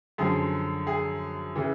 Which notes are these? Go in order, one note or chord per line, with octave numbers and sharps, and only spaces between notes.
F#2 D3 F3 G#4
G#4
C#3 E3